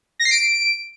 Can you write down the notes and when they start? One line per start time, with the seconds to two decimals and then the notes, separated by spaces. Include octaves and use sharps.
0.19 A#6
0.25 C7
0.31 D7